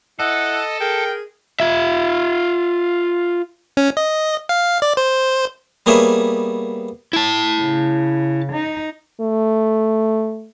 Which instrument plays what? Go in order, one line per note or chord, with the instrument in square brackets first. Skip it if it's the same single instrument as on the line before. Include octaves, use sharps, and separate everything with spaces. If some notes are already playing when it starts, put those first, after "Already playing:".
[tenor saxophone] E4 [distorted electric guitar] A4 [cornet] D#5 [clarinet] F#5
[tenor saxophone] G#4 [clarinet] A#4 [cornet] G5
[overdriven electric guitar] F4 E5
[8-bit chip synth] C#4
D#5
F5
D5
C5
[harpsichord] G3 A#3 B3 G#4 C#5 E5
[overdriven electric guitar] E4 A5
[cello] C#3
D#4
[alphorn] A3